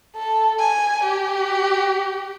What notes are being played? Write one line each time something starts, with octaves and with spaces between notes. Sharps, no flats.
A4
G#5
G4